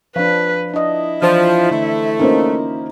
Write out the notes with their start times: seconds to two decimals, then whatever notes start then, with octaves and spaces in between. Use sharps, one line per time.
0.16 F3 D4 B4 F5
0.74 D4 E4 D#5
1.22 E3 F3 D4 C5
1.71 D3 A3
2.19 A#3 C#4 D#4 F4 C5